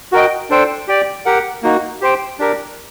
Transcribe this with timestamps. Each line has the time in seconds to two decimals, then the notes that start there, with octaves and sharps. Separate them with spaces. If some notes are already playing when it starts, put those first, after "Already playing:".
0.12 F#4 A#4 D#5 G5
0.50 D4 A4 C5 G5
0.88 G4 D5 G5
1.26 G4 A#4 F#5
1.63 A#3 D#4 F#4
2.01 G4 C5 G5
2.39 D4 G4 A#4